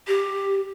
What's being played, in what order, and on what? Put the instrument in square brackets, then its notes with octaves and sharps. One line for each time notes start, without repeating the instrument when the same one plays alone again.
[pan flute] G4